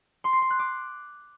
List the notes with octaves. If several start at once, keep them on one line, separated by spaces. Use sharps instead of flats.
C6
C7
C6
F#6
D6